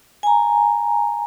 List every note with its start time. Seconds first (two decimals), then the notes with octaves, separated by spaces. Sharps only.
0.23 G#5 A#5